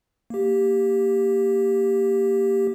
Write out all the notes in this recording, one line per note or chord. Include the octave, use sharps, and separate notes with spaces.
A#3 G4